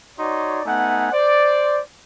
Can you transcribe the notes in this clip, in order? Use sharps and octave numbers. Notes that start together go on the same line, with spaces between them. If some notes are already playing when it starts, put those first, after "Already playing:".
D#4 F#4 C#5 D5 C6
A3 B3 D#4 F#5 G#5
C5 D5